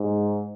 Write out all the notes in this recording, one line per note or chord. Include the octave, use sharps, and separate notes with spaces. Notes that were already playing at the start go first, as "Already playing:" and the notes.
Already playing: G#2